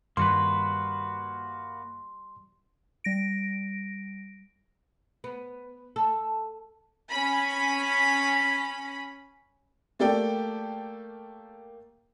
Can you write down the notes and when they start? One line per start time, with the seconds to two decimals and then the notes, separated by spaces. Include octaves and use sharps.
0.17 G2 D#3 G3 A#3 F#4 B4 C6
3.04 G3 A#6 D7
5.24 B3
5.96 A4
7.10 C#4 B5
9.99 A3 A#3 G4 A4 D5 G5